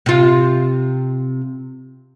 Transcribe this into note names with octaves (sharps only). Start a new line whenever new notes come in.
C3 F4